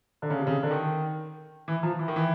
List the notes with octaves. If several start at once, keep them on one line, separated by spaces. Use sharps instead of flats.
D3
C#3
C3
C#3
D3
D#3
E3
F3
E3
D#3
E3